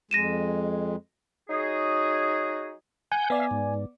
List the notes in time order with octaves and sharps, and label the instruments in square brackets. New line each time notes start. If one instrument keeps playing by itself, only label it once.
[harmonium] F2 G#3 [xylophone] A#6 D#7 E7
[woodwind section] F#3 D#4 F#4 G#4
[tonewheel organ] F#5 G6 [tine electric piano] G#5
[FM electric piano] B3 D5 [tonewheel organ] E5 F5
[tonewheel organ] G#2